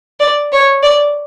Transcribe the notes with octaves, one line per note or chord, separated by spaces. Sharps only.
D5
C#5
D5